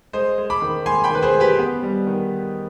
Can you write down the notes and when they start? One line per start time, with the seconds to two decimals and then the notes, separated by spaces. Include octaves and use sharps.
0.13 G#3 C5 D#5
0.38 G#3
0.50 B5 D6
0.62 D#3
0.86 G#3 G#5 C6
1.04 G5 B5
1.10 D#3 B4
1.22 G#4 C5
1.35 G#3
1.40 G4 B4
1.58 B3
1.83 G3
2.07 D#3